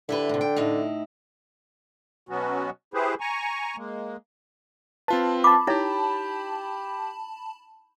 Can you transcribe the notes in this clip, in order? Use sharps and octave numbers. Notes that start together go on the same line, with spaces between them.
D3 E4 G4 B4
A2 C3
G5
A2 D#4 E4
B2 F#3 B3 C#4 F#4
E4 G4 G#4 B4 C5
G#5 A#5 C#6
G#3 A#3
C4 F4 B4 A5
A5 B5 D6
D#4 E4 G4 C#5 G5